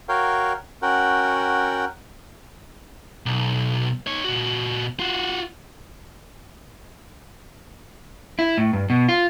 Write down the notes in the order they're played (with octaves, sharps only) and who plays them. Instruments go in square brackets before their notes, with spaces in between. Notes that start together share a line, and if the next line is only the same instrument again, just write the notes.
[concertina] F#4 A#4 C#5 F5 G5
C#4 F#4 A#4 F#5 G5
[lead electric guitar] B1
D#4 C#5
A#2 F#4
F4 F#4
[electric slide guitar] E4
A2
G2
B2
F4